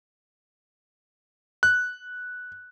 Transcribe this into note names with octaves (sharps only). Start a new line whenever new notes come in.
F#6